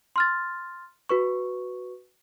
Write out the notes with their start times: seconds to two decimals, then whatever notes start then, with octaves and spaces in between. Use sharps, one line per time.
0.16 C6 F6 A6
1.09 F#4 B4 C#6